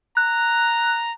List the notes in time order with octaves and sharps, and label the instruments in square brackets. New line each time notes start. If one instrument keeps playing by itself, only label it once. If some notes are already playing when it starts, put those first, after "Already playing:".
[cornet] A#5 [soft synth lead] F#6